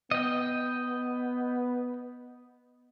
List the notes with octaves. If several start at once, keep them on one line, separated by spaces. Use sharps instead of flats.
B3 D#5 G5